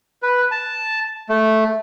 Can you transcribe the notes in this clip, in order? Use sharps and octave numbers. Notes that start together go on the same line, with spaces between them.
B4
A5
A3